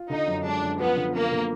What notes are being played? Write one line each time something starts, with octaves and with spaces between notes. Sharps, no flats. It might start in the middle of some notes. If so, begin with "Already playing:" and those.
Already playing: F4
D3 D#4
F#2
G#3 D4
F#2
F3 B3
D3
A#3 B3
D3